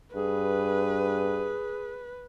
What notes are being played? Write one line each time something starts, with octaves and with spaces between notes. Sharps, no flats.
G2 G#4 B4